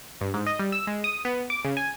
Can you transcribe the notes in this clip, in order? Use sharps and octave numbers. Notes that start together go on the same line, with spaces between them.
G2
G#2
D#5
G3
E6
G#3
D#6
B3
D6
C#3
G#5